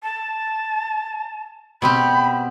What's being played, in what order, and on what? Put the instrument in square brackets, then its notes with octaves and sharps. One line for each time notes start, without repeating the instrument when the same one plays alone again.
[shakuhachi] A5
[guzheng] B2 C4 G4 [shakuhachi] B5